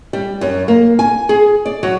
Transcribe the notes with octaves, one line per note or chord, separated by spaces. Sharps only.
G3
F#2
A#3
G#5
G#4
D5
F#3